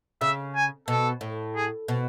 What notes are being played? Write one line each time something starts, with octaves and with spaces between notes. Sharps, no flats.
C#3 E5
G#5
B2 A4
A2
G#4
B2